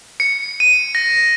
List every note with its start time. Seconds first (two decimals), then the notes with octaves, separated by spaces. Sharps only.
0.20 C#7
0.60 D#7
0.95 A#6